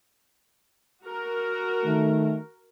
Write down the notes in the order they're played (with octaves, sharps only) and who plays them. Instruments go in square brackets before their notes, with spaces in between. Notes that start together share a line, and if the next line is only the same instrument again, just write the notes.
[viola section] F#4 A#4
[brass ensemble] D#3 A3